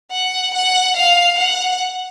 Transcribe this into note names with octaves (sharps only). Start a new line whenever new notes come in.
F#5
F#5
F5
F#5